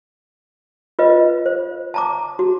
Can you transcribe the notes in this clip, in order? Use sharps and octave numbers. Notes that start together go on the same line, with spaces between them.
F4 B4 D#5
C5
A5 A#5 D6
F#4